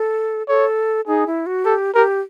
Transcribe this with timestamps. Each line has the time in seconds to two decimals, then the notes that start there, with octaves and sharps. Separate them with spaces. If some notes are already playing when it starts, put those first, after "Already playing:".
Already playing: A4
0.48 A4 C#5
1.07 D#4 G#4
1.27 E4
1.46 F#4
1.65 G4 A4
1.95 G4 A#4